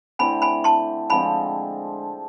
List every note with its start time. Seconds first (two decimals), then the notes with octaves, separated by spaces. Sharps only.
0.19 D3 A3 C4 E4 G#5 B5
0.42 G#5 B5
0.64 A5 C6
1.10 D3 F3 G#3 C4 G#5 B5